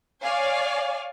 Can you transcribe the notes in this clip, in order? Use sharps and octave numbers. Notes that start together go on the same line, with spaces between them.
C#5 D5 F5 G#5